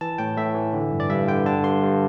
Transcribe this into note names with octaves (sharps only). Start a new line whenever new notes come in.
E3 A5
A2 G5
A2 E5
E3
D3
G2
D5
G2 E5
D3 G5
D3 A5
G2 C6
G2